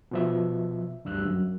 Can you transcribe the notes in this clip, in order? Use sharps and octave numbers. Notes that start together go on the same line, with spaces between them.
B2 F3 E5
D2 G2 E6 F#6
F#2